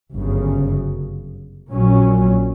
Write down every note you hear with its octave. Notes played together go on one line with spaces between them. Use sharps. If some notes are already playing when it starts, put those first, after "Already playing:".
G1 F#2 C#3
A#1 A#2 F#3 C#4